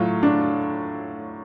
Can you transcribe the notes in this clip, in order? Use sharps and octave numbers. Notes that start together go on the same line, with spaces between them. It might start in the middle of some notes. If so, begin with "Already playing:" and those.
Already playing: A2 F#3 F4
D4